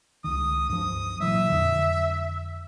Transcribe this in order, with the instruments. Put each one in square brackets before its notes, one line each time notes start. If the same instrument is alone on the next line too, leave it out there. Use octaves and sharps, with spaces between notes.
[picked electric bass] C#2 D#3 [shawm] D#6
[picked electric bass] G2 F3 [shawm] D#6
[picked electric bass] A#2 E3 F#3 [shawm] E5
[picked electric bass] F2 D3